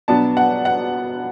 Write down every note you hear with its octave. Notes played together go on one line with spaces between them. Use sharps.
B2 F#3 B3 D4 A5
F#5
F#5